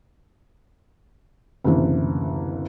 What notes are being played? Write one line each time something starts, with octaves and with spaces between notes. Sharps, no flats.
F#1 D2 C3 E3